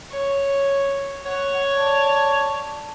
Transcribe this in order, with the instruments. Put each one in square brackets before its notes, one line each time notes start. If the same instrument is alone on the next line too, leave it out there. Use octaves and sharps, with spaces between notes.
[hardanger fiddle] C#5
[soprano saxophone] C#5 [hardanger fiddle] F#5
[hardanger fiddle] D5 A5